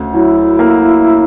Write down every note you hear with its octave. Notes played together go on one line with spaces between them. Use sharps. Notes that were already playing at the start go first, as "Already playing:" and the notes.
Already playing: D2 C#3
F#3 E4
A#3